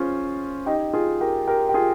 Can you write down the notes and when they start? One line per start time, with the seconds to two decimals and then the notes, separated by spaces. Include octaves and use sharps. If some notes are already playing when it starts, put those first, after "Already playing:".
Already playing: C#4 F4 G#4 C5
0.66 D#4 G4
0.94 F4 G#4
1.21 G4 A#4
1.47 G4 A#4
1.69 G4
1.74 F4 G#4